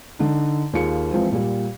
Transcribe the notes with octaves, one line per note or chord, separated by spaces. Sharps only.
D3 D#4
D#2 A#3 F4 G#4 C#7
E3 F3 G#3 C4
A#2 G3